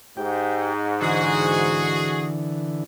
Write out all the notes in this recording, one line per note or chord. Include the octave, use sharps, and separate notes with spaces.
G#2 G4 G5
D3 E3 F#4 G#4